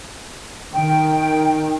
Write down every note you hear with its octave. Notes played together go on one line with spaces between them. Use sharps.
D#3 G5